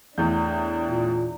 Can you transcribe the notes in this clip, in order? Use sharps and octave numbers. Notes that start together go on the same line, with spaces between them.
E2 A2 D4 G6
A#2